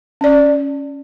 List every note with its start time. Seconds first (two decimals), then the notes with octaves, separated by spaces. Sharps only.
0.21 C#4 D5